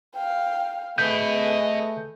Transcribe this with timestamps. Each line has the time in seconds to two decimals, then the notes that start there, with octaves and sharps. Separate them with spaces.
0.15 F5 G5
0.98 A3 G#4 B4 D#5 B5 G6